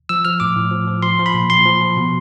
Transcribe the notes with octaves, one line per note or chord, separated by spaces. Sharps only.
F3 E6
F3 F6
A2 D6
A2
F3
F3
F3 C6
F3
B5
A#2
A#2 C6
F3
F3
B2